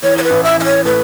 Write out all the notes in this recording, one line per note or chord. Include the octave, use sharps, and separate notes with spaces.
E3 C#5
C#5
B4
A1
E5
E3 E5
C#5
A2 B4